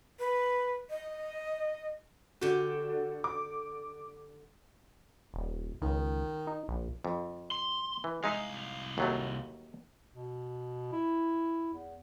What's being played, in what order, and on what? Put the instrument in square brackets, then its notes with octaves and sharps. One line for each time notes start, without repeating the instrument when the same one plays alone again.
[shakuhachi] B4
D#5
[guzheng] D3 G4 [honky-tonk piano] F#4
[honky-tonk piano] D6
[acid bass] D#1
[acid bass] C#2 [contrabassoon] D#3
[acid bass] D#4
A#1
[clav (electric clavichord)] F2
[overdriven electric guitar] C6
[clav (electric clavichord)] E3
[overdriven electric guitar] C2 F5 [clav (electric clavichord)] G#3 D#4 E5
[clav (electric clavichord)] D#2 F#3 A3
[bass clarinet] B2
E4
E2